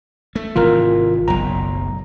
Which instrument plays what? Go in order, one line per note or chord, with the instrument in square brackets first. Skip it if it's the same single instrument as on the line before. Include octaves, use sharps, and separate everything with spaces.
[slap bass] A3
[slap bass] G#1 C3 E3 [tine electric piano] F4 A#4
[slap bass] F#1 B1 [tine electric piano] A#5